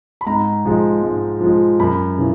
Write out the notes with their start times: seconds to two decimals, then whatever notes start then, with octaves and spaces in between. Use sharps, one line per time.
0.21 B5
0.27 G#2 A#5
0.65 F3 G#3
1.02 G#2
1.41 F3 G#3
1.80 F#2 B5
2.18 C#3 E3